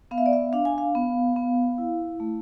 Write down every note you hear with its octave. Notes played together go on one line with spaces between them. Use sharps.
B3 F5
E5
D5
E5
D4 F5
G#5
F5
B3
B3
E4
A3